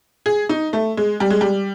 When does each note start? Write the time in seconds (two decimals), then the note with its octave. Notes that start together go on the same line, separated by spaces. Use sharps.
0.26 G#4
0.49 D#4
0.73 A3
0.97 G#3
1.20 G3
1.30 G#3
1.41 G3